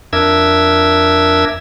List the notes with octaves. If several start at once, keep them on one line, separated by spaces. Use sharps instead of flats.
F2 D4 A#4 E5 E6 G#6